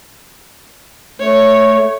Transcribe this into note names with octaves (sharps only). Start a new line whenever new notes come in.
A3 C#5